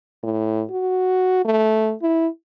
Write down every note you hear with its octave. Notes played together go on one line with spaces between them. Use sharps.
A2
F#4
A3
E4